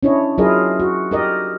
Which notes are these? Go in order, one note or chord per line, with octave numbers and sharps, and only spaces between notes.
C#4 D4 E4 C#5 D#5
F#3 E4 F4 G#4 A#4 D#5
F#4
D#4 G4 A#4 D5 D#5